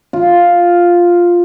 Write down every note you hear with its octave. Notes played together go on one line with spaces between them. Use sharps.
F4